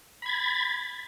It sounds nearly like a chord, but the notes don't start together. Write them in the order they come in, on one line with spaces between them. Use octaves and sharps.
B5 G#6 A6